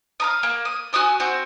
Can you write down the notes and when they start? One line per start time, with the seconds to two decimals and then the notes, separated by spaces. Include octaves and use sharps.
0.20 F5 A#5 D#6
0.43 A#3
0.65 D#6
0.93 F#4 G#5 D#6 E6
1.20 C4 F#4